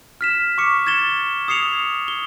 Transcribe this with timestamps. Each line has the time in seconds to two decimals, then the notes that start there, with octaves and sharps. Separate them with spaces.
0.21 F6 B6 E7
0.58 C#6 D6 C#7
0.87 G#6 A6 E7 G7
1.48 D#6 G#6 C7 C#7 F7
2.08 G7